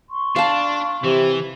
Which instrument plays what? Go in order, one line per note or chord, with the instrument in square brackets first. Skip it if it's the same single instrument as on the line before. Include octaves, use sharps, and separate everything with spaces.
[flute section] C6 C#6
[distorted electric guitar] D4 [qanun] F5 A5
[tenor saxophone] C3 [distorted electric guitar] E3